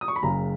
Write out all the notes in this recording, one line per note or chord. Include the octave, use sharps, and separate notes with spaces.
D#6
C#6
B5
F#1 F#2 C#3 A#5